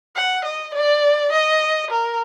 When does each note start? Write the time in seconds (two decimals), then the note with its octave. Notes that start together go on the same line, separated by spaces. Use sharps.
0.16 F#5
0.45 D#5
0.74 D5
1.32 D#5
1.91 A#4